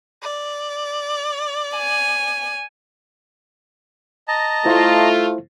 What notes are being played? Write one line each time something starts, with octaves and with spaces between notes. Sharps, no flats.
D5
G#5
D#5 A5 A#5
A3 E4 F4 C5